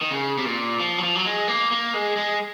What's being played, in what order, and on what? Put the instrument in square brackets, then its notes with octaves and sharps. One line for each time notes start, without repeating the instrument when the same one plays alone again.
[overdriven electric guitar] D#3
C#3
C3
A#2
F3
F#3
F3
F#3
G#3
A#3
A#3
G#3
G#3